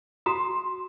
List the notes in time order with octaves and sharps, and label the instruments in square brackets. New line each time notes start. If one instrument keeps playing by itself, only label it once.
[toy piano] F#4 A#5 D#6 [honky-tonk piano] C6